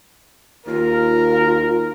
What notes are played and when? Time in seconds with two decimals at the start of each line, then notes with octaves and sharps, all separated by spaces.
0.66 D#2 F4 A#4